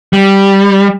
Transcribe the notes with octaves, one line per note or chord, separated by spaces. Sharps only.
G3